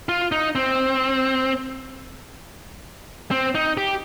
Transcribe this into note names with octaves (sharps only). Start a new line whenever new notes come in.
F4
D#4
C4
C4
D#4
G4